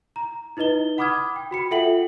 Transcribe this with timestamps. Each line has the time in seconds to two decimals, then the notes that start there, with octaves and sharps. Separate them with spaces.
0.16 A#5
0.57 D#4 E4 B4 D#5 G7
0.98 F#5 B5 D6 D#6 F6 G#6
1.36 G5
1.51 F#4 B5 C#7
1.71 F4 A4 E5 F#5 G5 F#7